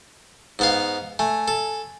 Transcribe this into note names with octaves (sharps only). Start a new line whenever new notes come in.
G#2 B3 F5
A3 G#5
A4